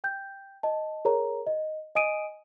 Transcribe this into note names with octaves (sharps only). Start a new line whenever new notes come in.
G5 G6
D#5 A5
G#4 A#4 C#5 A#5
D#5
D#5 G#5 D#6 D7 D#7